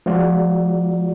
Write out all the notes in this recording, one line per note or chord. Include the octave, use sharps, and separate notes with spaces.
F3 G#3 F4 F#4 D5